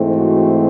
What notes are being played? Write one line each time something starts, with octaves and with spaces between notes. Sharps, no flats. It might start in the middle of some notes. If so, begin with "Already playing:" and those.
Already playing: G#2 E3 A3 C4
F#4